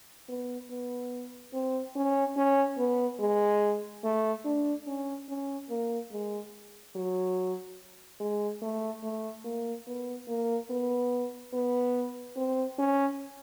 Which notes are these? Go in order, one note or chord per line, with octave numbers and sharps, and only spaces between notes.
B3
B3
C4
C#4
C#4
B3
G#3
A3
D4
C#4
C#4
A#3
G#3
F#3
G#3
A3
A3
A#3
B3
A#3
B3
B3
C4
C#4